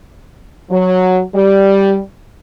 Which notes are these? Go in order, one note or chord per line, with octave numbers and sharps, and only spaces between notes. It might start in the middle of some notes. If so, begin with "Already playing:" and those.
F#3
G3